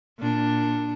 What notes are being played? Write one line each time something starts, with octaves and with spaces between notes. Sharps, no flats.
A#2 D4